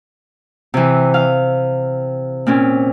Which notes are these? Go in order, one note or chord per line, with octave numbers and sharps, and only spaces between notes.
C3 E3
F5
A#2 C4 C#4